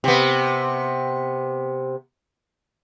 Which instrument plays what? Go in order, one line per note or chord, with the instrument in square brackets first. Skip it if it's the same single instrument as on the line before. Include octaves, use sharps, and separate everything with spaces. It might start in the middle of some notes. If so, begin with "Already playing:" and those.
[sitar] C3 B3